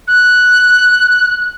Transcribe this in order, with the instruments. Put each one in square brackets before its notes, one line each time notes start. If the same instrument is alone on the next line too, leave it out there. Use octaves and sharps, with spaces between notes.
[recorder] F#6